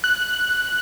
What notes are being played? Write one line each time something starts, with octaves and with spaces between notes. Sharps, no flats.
F#6